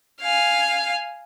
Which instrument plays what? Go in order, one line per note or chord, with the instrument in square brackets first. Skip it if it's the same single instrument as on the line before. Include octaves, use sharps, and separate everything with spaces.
[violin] F5 G#5